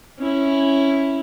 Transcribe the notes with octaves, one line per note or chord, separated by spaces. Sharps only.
C#4 E4